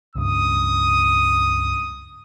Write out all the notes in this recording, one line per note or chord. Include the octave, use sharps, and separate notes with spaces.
C#2 G2 D#6